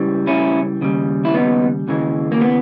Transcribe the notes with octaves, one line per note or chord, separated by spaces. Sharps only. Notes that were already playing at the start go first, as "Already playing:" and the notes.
Already playing: C#2 C#3 E3 G3
C#4 E4
D#2 C#3 G3
E4
B3 D#4
D#2 C#3 E3 G#3
A#3
B3